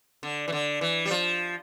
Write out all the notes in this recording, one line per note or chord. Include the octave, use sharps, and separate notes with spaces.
D3
E3
D3
E3
G3
F3